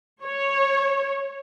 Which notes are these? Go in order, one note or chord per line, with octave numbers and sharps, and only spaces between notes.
C#5